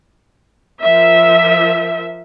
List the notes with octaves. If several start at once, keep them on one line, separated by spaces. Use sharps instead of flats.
F3 A#4 E5